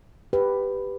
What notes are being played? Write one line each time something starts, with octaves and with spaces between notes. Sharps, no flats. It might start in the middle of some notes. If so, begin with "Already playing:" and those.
G4 B4